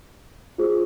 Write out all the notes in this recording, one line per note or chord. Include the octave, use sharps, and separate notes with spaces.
F4 G#4 C5